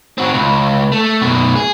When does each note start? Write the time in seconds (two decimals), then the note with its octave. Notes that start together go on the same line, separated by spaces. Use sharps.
0.18 C4 F#4
0.34 C#2
0.92 A3
1.22 F#2 B2
1.56 G#4